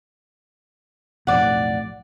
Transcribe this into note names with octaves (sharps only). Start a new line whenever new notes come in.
B1 F2 A2 D5 F#5